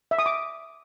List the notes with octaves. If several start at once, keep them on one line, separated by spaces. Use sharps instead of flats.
E5
D#6
D6